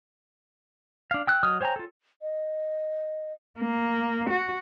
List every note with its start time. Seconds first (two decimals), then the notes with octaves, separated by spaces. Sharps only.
1.11 D4 F5
1.27 G5 E6 F#6
1.43 F#3 D#5 D#6 F6
1.61 C5 C#5 G5 G#5 A#5
1.76 F4 A4
2.22 D#5
3.59 A#3
4.30 F#4